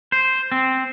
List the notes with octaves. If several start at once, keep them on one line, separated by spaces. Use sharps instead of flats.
C5
C4